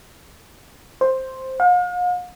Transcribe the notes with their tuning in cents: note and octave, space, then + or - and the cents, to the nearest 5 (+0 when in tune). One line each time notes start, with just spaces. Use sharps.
C5 +5
F5 +45